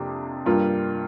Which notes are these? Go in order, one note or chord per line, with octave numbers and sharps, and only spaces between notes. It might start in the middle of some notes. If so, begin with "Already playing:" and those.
Already playing: F2 C3 A#3 D4
G2 G3 A#3 F4